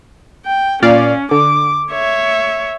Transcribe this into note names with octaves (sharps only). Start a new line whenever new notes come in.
G5
A#2 C#4 D5 F5
D3 D6
C#5 E5